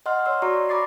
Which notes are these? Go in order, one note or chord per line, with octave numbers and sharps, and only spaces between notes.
D#5 F#5 C6 F6
C#5 C6 E6
F#4 D5 A#5 C#6
A#5 B5 C#6 D6 A6 C7